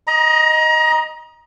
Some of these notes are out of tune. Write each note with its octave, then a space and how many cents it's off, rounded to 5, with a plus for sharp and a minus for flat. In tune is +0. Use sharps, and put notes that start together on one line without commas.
D#5 +0 A#5 +30